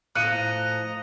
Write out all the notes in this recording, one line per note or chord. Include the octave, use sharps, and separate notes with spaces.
A2 F3 D#5 A#5 F#6 C#7 D#7